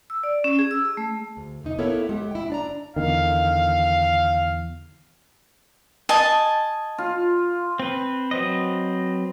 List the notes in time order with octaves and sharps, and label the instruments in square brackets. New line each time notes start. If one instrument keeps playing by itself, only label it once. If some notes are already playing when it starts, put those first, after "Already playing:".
[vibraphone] E6
D5
C#4
G#4
E6
G#4
A3
[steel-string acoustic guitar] D2
E2 C3 D#4
A#3 B3 E4 A4 A#4 C#5
G#3 G4 F#5
E4 G5
D4 D5 A#5
[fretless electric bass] E2 D3 D#3 [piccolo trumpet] F5
[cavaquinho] D#5 G#5 [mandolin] A5
[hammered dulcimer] F4
[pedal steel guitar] C4 B4
F#3 C4 B4 D#5